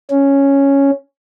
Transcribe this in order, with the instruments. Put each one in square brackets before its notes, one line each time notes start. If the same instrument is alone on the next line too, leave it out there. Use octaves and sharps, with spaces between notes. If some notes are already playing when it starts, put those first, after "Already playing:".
[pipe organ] C#4